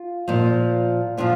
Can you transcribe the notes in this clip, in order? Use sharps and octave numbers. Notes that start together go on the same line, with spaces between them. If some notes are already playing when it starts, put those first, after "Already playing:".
Already playing: F4
A#2 F3
A#2 F3 D4 F4